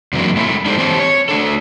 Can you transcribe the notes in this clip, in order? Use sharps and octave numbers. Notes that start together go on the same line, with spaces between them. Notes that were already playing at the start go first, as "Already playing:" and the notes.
F#2 C3 E3 F#3 A#3 D4
G#3 A3 E4
D4 D#4 G4 A4 A#4 C5
E3 C4 G4 C5 C#5 A5
C#5
A3 D4 A4